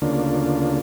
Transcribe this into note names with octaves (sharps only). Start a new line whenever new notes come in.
D2 C#3 A#3 D4 F4